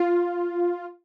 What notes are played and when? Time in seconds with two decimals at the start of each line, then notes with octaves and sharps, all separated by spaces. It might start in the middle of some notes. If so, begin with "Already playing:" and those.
Already playing: F4